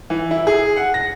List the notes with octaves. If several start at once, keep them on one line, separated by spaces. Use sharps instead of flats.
E3
E4
G#4
F#5
A#6